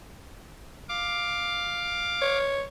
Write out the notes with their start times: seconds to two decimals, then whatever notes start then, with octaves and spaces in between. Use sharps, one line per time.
0.89 F5 D6
2.21 C#5